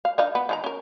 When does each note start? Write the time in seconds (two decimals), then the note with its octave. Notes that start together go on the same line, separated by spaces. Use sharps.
0.05 F5
0.18 D4 D#4 F5
0.35 B3
0.49 D#3 F4 A#5
0.64 C#4 A#4